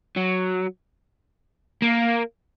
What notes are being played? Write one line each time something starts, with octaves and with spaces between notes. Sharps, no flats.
F#3
A#3